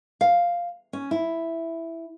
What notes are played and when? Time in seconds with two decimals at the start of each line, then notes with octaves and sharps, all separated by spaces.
0.21 F5
0.93 C#4
1.11 E4